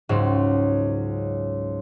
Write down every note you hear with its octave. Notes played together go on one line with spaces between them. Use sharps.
C#2 G#2 F#3